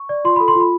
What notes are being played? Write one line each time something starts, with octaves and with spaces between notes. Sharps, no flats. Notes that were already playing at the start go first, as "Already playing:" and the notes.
Already playing: C#6
D5
F4 C6
A4 B5
C6
F4 B5